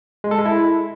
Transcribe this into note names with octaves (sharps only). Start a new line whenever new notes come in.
G#3
A4
G#3
E4